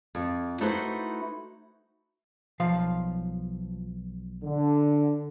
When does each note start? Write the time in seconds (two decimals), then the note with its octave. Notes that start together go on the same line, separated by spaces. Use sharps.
0.15 F2
0.61 A3 D#4 E4 F#4 B4 C5
2.60 B1 F3 F5
4.44 D3